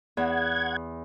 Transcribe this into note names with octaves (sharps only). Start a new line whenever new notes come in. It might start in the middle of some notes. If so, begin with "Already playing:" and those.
E2 F#5 G#6